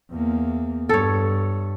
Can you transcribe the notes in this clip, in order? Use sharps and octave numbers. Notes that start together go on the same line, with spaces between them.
E2 A#3
G2 A4 C#5